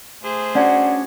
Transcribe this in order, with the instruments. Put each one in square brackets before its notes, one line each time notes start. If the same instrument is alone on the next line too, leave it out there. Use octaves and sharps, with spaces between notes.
[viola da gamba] A3 G#4 C5
[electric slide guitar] C#4 D4 F#4 [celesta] D5 F#5